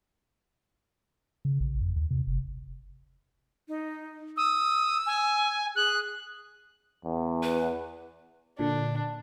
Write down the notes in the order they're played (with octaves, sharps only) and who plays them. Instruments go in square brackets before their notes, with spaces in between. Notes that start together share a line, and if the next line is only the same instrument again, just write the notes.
[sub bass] C#3
A1
F2
D#2
C3
F#1
[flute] D#4
[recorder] D#6 [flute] E6
[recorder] G#5
[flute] G#4 [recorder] F#6
[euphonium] E2
[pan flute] B4
[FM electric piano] A#2 D3 [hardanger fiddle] D4